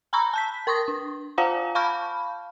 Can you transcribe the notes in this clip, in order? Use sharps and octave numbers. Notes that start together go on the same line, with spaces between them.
G#5 A#5 B5 C#6 E6
A5 G6 B6
A#4 C6 C#6 D#6 A#6
D4
F4 C5 F5 F#5 G#5 A#5
F5 A5 B5 C#6 F6 G6